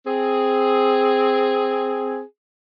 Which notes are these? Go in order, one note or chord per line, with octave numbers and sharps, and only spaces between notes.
C4 G#4